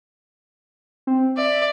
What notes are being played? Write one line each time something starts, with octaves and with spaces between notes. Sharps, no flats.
C4
D5 E5